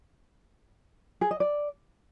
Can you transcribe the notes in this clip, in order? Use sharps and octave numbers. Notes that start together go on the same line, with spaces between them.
G#4
D#5
D5